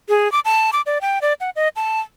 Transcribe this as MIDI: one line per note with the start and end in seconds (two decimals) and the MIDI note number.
0.09 0.31 68
0.32 0.40 86
0.45 0.70 81
0.73 0.81 86
0.86 0.98 74
1.01 1.19 79
1.22 1.33 74
1.40 1.50 78
1.56 1.68 75
1.76 2.00 81